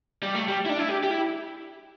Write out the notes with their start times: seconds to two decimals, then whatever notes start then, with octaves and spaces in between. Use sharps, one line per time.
0.22 G3
0.35 A3
0.48 G3
0.66 E4
0.70 D4
0.79 E4
0.89 G4
1.04 G4
1.11 E4